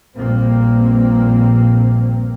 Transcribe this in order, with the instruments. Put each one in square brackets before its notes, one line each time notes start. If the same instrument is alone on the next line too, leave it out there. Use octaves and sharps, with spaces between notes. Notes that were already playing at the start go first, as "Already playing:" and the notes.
[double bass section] A#1 G2 A#2 A#3 C4